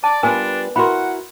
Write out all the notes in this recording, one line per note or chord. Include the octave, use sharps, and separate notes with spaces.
D5 A5
G3 B3 D4 F4 A#4 G#5
E4 F#4 A#4 F#5 B5 C6